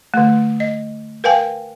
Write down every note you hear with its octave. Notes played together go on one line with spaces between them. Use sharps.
D3 A3
D#5
A#4 B4 F5 G5 G#5